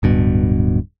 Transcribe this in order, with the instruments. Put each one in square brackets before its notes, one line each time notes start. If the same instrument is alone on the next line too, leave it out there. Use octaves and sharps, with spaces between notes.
[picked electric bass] D1 G2 B2